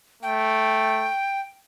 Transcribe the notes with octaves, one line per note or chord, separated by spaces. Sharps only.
A3 G5